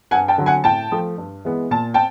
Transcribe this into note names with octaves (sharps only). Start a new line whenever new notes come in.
G2 F#5 G#5
G5 A5
D3 F#3
F#5 G#5
A2 G5 A5
F3 A3
G2
E3 G#3 B3
A#2 A5
G5 A5